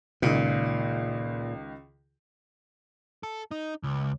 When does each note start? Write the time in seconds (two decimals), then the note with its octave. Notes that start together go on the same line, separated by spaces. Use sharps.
0.22 C#2 A#2 D#3
3.23 A4
3.51 D#4
3.83 C#2